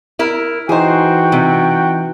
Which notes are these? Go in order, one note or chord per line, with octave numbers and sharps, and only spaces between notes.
E4 A#4
E3 D#4 F#4 G#4 C5 G5
C3